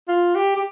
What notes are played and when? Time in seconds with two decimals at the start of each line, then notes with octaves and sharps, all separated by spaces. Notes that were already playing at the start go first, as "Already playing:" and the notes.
0.08 F4
0.35 G4
0.56 G4